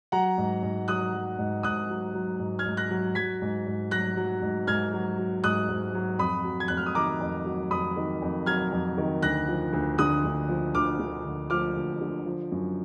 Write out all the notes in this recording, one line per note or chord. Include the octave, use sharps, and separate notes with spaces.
F#3 F#5 A#5
G#2
G#2
F#3 D#6 F#6
F#3
G#2
G#2 D#6 F#6
F#3
F#3
G#2
F6 G#6
G#2
F#6 A#6
F#3
F#3 G#6 B6
G#2
G#2
F#3 F#6 A#6
F#3
G#2
G#2 F6 G#6
F#3
F#3
G#2 D#6 F#6
G#2
F#3
F2 B5 D#6
F#3
G#6
F2 F#6
F6
D#6
D#3 A#5 D6
F2
F#3
F2 B5 D#6
D#3
F2
F#3 F6 G#6
F2
D#3
D2 F#6 A#6
F3
D2
D3 D#6 F#6
D2
F3
D2 D6 F6
D3
D2
F3 D6 F6
D2
D3
F3
F#2